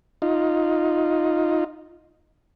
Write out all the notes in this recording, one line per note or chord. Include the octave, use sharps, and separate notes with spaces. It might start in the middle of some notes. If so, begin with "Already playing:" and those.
D#4 F4